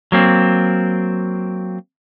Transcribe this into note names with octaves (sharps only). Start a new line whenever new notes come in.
F#3 A#3 C4